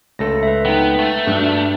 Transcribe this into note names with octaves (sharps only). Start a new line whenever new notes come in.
C#2 A3 A4 A#6
B4 E5
B3 D#4 G5
A3
G2 D4 F#4